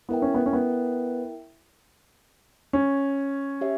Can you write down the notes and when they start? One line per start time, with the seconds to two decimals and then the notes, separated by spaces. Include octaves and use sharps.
0.09 B3 E4 A#4 E5 G5
0.22 C#4
0.34 B3
0.46 C#4
0.53 B3
2.73 C#4
3.61 G4 C#5 E5